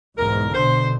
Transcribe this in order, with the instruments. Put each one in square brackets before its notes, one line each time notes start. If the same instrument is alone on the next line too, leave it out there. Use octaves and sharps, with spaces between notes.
[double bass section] B1 E2 G#2 [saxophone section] A#4
[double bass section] B2 D3 [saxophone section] C5